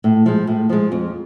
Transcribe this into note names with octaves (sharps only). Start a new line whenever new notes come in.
A2
F3 G#3
A2
F3 G#3
F2